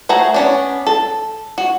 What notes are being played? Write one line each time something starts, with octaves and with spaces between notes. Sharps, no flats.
A3 F#4 G#4 C5 A#5
B3 C#4 D4
A4
F#4